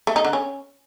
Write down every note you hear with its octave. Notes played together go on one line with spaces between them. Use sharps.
A3
D#4
D3
C#4